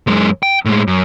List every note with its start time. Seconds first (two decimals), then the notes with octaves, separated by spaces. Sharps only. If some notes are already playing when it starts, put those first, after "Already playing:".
0.07 F#2 G#3
0.43 G5
0.65 A2 G#3
0.87 F#2